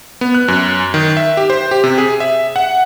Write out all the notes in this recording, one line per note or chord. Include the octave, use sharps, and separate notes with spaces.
B3
F#6
F#2
D#3
E5
G4
C5
G4
C3
G#4
E5
F#5